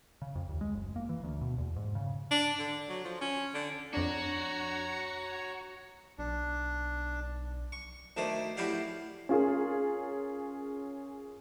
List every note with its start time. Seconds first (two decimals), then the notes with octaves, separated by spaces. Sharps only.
0.22 C#3
0.35 F2
0.49 D#2
0.61 G#3
0.74 F#1
0.96 A#3
1.09 E3
1.23 D2
1.41 B2
1.58 E2
1.76 G#2
1.95 C#3
2.31 D4
2.59 D3
2.89 F#3
3.05 F3
3.21 C#4
3.54 D3
3.93 F2 D4 F#4 C#5 A#5
6.19 B1 D4
7.72 C#6
8.17 D2 D#3 A3 C5 D5
8.57 A2 E4 F#4 G4 D5 F5
9.29 C#4 F4 G#4 A#4